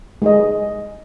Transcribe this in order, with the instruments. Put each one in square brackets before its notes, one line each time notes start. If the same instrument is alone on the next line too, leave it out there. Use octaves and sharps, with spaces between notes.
[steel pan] G#3 G#4 D#5